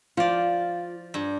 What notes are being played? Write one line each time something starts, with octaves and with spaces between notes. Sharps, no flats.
F3 F4 D5
G2